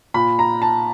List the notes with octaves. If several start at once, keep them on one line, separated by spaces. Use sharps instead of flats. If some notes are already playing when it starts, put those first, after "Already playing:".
A#2 B5
A#5
A5